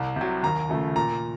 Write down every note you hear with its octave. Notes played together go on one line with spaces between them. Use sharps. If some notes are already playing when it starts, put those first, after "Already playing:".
Already playing: C2
C3 F#3
D#2 A#5
C#3 F3 A3
A#2 A#5